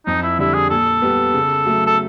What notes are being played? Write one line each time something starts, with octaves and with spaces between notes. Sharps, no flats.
F2 D#4
E4
D3 G3 E4
G#4
A#2 A4
G3 B3
C#3
F#3 A3
A4